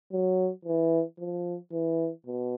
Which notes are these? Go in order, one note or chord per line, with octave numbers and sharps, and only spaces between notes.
F#3
E3
F3
E3
B2